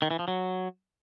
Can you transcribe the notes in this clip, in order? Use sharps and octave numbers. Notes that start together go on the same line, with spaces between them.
D#3
E3
F3
F#3